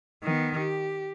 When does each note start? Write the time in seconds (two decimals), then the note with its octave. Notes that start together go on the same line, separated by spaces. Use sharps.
0.23 D#3 B3
0.57 G4